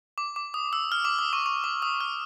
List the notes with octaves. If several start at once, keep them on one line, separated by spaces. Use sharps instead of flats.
D6
D6
D#6
E6
F6
D6
D#6
C#6
C#6
D6
D#6
F6